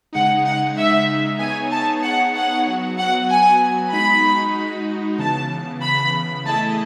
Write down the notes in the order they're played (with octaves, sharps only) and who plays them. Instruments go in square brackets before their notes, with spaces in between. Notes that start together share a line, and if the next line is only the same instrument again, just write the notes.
[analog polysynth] C#3 G#3 D#4 [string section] F#5
[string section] F#5
E5
[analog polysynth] B3 D#4 G#4 C#5 [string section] G#5
[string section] A5
F#5
F#5
[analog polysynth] F#3 B3 F#4
[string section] F#5
G#5
[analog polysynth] G#3 D#4 F#4 [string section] B5
[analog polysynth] C#3 E3 B3 [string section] A5
[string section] B5
[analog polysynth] A3 E4 G#4 D#5 [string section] A5